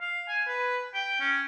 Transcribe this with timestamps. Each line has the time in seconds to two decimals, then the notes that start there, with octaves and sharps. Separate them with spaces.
0.01 F5
0.28 G#5
0.47 B4
0.94 G5
1.20 C#4